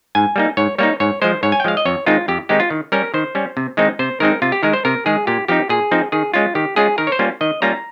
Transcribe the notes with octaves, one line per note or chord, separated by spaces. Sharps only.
G#2 G#5
G3 A#3 D#4
G#2 C#5
G3 A#3 D#4 C#5
G#2 C#5
F3 G#3 C5
G#2 C#5
G#5
G5
F3 G#3 F5
D#5
F2 C#5
D#3 G#3 C4 D#4 F4
F2 G4
D#3 G#3 C4 D#4 G4
F4
D#3
G3 C#4 A#4
D#3 C5
G3 C#4
C3
D#3 G#3 C4 D#4
C3 C5
D#3 G#3 C4 D#4 A#4
C3 F4
G4
D#3 G#3 A#4
C5
C3 A#4
D#3 G#3 G#4
A#2 G4
F3 C4 D#4 G4
A#2 G#4
F3 C4 D#4
D#3 G#4
G#3 C#4 F4
D#3 G4
G#3 C#4 F4 G#4
D#3 A#4
C#5
C5
G3 A#3 C#4 F4
D#3 D#5
G3 A#3 C#4 F4 A#5